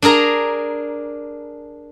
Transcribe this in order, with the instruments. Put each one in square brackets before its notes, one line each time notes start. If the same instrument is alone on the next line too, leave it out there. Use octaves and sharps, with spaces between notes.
[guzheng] D4 G#4 A#4 A#5